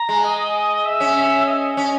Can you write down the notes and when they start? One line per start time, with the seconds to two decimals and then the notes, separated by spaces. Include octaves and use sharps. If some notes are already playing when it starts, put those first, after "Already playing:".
Already playing: A#5
0.09 G#3
0.24 D#5
0.85 E5
1.00 C#4
1.46 D#5
1.77 C#4